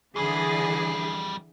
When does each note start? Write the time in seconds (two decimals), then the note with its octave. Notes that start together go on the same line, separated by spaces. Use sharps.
0.16 F2 D3 E3 G3 G#4